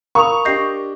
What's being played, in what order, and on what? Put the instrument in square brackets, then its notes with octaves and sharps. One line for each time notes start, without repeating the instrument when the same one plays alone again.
[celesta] A#4 D#6 F7 [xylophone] F5 A#5 [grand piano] B5 [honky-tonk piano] C#6
[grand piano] D4 G4 D#5 [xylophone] G6 A#6 C7